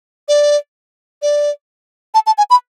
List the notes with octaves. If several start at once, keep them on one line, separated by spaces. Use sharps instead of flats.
D5
D5
A5
A5
G#5
B5